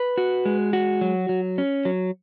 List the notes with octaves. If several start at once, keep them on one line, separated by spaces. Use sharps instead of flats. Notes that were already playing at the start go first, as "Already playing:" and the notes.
Already playing: B4
F#4
G#3
F#4
F#3
F#3
C#4
F#3